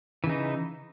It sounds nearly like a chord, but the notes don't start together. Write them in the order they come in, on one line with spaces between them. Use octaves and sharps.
E3 C#3 D#4